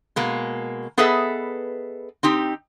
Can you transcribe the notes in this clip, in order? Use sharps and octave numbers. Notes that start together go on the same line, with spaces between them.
B2 G#3 A#3
B3 G#4 A4 B4 D#5 E5
C4 D#4 G4